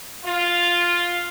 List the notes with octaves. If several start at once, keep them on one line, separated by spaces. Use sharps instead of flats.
F4